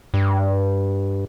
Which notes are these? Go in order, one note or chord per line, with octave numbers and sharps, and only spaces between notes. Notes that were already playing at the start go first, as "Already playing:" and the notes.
G2